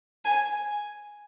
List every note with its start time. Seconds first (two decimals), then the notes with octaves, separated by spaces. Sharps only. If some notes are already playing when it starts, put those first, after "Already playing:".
0.25 G#5